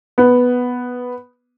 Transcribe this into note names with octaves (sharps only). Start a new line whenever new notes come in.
B3